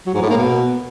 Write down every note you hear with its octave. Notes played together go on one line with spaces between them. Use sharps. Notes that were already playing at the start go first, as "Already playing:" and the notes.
F#3
G#2
A2
A#3
B2